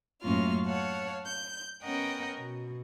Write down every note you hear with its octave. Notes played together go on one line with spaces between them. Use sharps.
F#2 A2 A#3 C#4 F4 F6
C#5 F5 F#5 A5
G6
B3 C#4 A#4 D#5 F#5 G5
B2